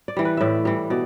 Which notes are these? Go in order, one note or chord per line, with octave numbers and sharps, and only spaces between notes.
D5
E3 G3
B4
A2 D5 E5
E3 G3
B2 D5